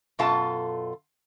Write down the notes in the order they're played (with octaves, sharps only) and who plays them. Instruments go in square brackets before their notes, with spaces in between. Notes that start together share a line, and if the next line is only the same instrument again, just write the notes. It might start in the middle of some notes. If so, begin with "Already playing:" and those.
[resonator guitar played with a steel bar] F#2 B2 F4 A4 A5